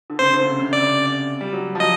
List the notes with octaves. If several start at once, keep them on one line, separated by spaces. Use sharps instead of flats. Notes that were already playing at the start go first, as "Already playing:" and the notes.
D3
C#3 C5
D3
C#3
C3
C#3
C3 D5
C#3
G3
F#3
F3
F#3 D#5